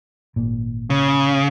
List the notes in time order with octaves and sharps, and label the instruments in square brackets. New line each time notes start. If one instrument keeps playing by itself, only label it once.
[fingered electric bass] G#1 A#2
[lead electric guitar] C#3